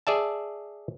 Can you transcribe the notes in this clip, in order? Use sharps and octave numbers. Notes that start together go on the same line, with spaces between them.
G#4 D5 E5 A5